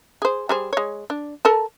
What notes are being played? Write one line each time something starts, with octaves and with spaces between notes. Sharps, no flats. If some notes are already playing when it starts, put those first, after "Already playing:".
G#4 C5
G3 G#4 C5
G#3 C#5
D4
A4 A#4 A5